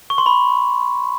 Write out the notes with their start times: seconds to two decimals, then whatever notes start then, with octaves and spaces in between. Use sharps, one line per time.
0.10 C#6
0.18 C6
0.26 B5